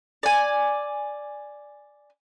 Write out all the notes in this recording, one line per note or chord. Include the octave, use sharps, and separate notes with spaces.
D5 G#5